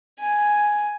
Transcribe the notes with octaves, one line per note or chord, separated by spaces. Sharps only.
G#5